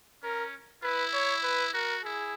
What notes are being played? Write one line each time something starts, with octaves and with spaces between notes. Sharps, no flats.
C#4 A#4
E4 B4
C#5
B4
F#4 A#4
E4 G#4